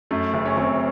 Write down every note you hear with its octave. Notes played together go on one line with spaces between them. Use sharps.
F#2 A3
F#1
C#4
F#1 C4